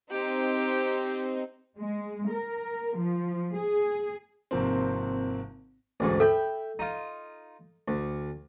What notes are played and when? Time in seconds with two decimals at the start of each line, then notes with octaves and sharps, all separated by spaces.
0.11 C4 D#4 G4
1.78 G#3
2.30 A#4
2.98 F3
3.57 G#4
4.51 G#1 C3 F3 A#3 C4
6.00 A1 D2 G#2
6.20 A4 E5 G5 B5
6.79 D#4 F4
7.88 D2